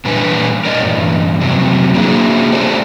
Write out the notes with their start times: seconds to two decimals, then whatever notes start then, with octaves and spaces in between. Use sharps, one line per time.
0.05 A#2 E3 G3 D4 B4 G#5
0.65 A#4 D5 D#5
0.83 E2 G2
1.40 F2 C3 F#3
1.95 A#3 D4 E4 F#4 G#4
2.52 G#3 G4 A4 C5 D5